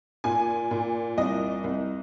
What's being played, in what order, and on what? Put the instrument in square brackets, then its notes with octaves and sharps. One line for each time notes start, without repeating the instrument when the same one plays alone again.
[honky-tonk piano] A#2 G#5
A#2
C2 D#5
C2